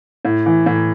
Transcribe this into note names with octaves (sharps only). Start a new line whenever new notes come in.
A2
E3
A2